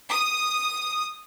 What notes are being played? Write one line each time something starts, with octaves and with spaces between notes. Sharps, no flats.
D#6